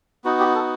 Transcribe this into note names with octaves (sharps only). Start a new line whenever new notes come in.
B3 D#4 F#4
G4
A4